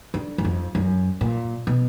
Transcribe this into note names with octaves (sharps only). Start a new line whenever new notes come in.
D3
F#2
F2
F#2
A#2
B2